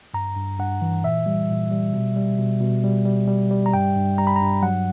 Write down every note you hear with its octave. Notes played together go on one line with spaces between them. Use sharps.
G2 A#5
G2
G2 F#5
E3
A#2 E5
G3
A#2
G3
B2
G3
B2
B2
G3
G3
G3
G3
A#5
G2 G5
G2
G3 A#5
B5
G2 A#5
F#3 F#5